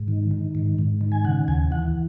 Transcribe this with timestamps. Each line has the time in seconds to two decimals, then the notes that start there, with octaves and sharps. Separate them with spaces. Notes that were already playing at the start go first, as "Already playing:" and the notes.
Already playing: G#2
0.08 D#3
0.31 D#3
0.55 G#2
0.78 G#2
1.01 D#3
1.12 G#5
1.24 C#3 F#5
1.48 D#2 G#5
1.71 E3 F#5